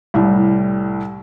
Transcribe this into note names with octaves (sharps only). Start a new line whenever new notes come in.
C2 A2 G3